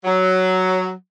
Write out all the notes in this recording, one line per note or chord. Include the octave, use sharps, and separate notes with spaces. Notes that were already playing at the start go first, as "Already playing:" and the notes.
F#3